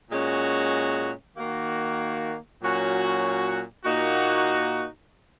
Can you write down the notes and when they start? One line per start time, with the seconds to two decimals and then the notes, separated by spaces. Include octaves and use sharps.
0.11 A#2 G#3 C#4 F#4
1.36 D#3 A#3 F#4
2.61 A#2 F#3 C#4 F#4
3.85 A#2 A#3 D#4 F#4